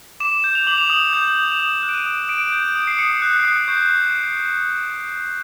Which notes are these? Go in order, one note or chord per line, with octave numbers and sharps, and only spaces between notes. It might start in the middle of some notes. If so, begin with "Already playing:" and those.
D6 E7
G6
F7
D6 F#7
F7
D#6 F#7
G6
D#6
E7
D#6 F7
F#6
D7
D#7
D#6
D#6 D7
G6
D#6
C7
D#6 C#7
F#6
C7
D#6
C#6 G6